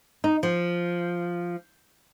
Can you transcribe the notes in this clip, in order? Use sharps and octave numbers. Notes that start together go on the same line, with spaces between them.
D#4
F3